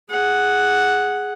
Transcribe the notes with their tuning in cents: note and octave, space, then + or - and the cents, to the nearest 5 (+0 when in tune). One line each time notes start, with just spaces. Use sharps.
G#4 +0 F#5 +0